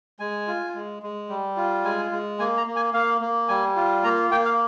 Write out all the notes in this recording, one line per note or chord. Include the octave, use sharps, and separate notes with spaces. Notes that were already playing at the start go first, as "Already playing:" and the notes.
G#3 G#5
F4
G#3
G#3
G3
F4
G#3 G#5
G#3
A#3 G#5
A#5
A#3
G#5
A#3 F5
A#3
G3 G#5
F4
A#3 A#5
A#3 G5
F5